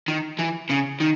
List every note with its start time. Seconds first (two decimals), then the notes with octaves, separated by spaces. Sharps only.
0.08 D#3
0.39 E3
0.70 C#3
1.01 D#3